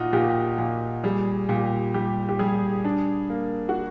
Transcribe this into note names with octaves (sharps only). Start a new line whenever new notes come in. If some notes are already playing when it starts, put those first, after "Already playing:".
Already playing: A#2 D#4 F4 F#4
A#2 G4
A#2
G3 G#4
A#2 G4
G3 G4
G4
G3 G#4
D4
A#3
F#4